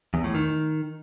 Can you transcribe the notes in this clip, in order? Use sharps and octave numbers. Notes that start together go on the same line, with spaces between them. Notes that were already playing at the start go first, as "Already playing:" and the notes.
E2
A2
D#3